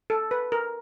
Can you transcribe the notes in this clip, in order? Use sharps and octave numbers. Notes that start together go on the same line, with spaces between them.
A4
B4
A#4